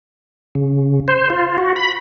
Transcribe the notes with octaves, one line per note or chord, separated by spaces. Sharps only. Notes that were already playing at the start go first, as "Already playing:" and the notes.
C#3
C5
F4
F#4
B5